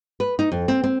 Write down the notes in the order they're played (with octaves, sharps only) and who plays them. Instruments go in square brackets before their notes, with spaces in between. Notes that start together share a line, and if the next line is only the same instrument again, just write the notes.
[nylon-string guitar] B4
D#4
F2
C4
C4